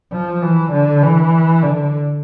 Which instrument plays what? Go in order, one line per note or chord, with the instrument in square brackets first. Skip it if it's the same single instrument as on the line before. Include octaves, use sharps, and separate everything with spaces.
[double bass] F3
E3
D3
E3
D3